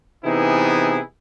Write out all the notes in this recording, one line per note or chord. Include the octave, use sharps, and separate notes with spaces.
C3 E3 B3 D#4 E4 G#4